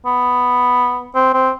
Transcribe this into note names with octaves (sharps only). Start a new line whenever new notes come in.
B3
C4
C4